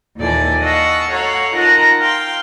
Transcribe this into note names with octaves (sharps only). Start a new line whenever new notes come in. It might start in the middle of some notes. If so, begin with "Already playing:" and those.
D#2 A#2 E3 A4 D5 G#5
D#5 F5 F#5 A5 C#6 E6
F#4 A4 C#5 F5 F#5 A#5
D#4 F4 A#4 F#5 A5 A#5
F5 G5 C6